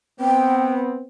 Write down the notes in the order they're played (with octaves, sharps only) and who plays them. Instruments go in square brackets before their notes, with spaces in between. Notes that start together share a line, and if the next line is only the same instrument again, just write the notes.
[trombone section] B3 C4 [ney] G5